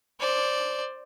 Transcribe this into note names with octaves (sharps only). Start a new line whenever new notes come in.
C5 D5